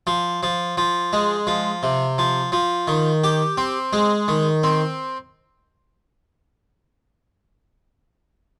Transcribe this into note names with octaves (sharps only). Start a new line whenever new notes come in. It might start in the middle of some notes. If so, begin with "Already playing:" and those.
F3
F3
F3
G#3
F3
C3
F3
F3
D#3
G4
C4
G#3
D#3
C4